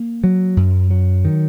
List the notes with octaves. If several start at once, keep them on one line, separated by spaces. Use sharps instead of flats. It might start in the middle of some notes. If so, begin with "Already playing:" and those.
Already playing: A#3
F#3
F#2
F#3
D#3